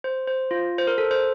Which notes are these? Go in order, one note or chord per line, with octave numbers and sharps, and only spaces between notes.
C5
C5
F4
C5
A#4
A4
C5